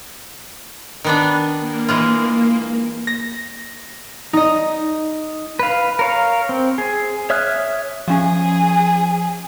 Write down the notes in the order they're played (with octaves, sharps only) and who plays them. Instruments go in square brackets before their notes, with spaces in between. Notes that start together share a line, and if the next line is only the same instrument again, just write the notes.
[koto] D#3 B3 D4
[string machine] A#3
[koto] E3 G#3 F4
[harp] A#6
D#4 D#5
[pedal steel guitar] B4 F5
A#4 C#5 F5
C4
G#4
C#5 E5 D#6 F6 F#6
[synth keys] F3 C#4 [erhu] G#4